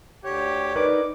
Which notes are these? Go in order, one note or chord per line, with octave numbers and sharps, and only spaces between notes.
D2 D3 G4 C#5
D#4 A#4 B4 D5 D6